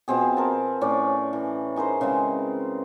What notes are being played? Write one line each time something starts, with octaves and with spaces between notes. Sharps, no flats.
B2 F3 C4 G#4
A#4 A5
A2 C#4 D5
E3
D#4 G#4 A#4 C5
C#3 E3 G#3 C4